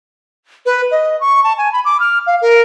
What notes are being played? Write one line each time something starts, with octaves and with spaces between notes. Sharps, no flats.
B4
D#5
C#6
A5
G#5
B5
D6
F6
F5
A#4